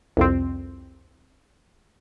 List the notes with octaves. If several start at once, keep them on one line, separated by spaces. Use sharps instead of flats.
C2 F2 C4